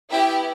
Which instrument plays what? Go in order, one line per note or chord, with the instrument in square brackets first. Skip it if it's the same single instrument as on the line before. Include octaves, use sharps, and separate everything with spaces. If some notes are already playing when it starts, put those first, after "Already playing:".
[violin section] B3 E4 G4 E5 G5